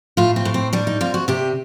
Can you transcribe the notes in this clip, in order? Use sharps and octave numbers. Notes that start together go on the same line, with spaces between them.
A2 F4
C4
A2
C4
G3 D4
D#4
C3 F4
F#4
C3 G4